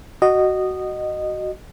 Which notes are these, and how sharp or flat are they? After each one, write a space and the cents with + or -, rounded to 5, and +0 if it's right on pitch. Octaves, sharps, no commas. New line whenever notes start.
F#4 +15 D#5 -15